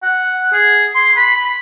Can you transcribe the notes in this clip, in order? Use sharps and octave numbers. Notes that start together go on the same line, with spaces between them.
F#5
G#4
C6
B5